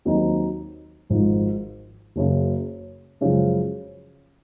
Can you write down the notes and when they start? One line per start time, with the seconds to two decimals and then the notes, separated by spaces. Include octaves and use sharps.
0.05 D#2 D#3 F#3 C4 D#4
1.10 G#1 G#2 F3
2.16 F#1 F#2 C#3
3.21 F#2 C#3 F3 G#3